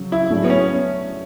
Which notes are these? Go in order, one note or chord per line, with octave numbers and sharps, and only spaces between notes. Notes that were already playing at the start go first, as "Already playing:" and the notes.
Already playing: C#3 F#3
E4
F#3 A3 E4 G#4 D5
B3
C#4